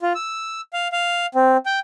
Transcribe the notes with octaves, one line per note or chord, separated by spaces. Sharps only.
F4
E6
F5
F5
C4
G5